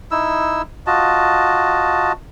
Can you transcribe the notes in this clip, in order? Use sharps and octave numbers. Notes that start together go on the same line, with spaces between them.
D#4 E4 E6
F4 F#4 D#5 A5